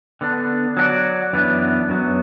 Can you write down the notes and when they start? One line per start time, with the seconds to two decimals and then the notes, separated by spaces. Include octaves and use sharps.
0.21 D3 B3 D4
0.77 F#3 D4 F#4 D5
1.33 F#2 E3 B3 D4
1.89 F#2 F#3 B3